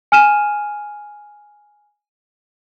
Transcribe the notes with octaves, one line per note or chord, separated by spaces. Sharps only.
G#5 F6 D#7 E7